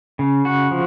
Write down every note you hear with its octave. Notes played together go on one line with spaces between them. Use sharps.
C#3
F#4
F3